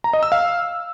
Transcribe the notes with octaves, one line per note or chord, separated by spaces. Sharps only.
A#5
D#5
E6
F5